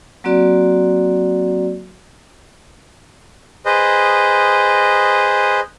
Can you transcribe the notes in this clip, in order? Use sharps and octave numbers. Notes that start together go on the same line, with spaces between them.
F#3 A#3 C4 F#4 D5
G#4 B4 C5 D#5